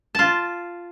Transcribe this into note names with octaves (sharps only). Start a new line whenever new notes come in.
F4 A5